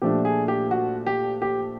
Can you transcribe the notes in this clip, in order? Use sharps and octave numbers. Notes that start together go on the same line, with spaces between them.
A#2 F3 A3 D4 G4
G#4
G4
F#4
G4
G4